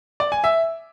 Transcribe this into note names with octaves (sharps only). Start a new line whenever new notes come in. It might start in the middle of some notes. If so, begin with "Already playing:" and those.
D5
G#5
E5